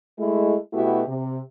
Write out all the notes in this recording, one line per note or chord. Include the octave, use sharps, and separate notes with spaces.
G#3 A3 E4
B2 A3 B3 E4 F#4 G4
C3